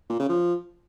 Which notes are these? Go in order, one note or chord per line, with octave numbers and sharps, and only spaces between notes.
A#2
C#3
F3